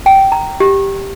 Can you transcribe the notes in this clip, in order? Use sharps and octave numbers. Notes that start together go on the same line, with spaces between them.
G5
A#5
G4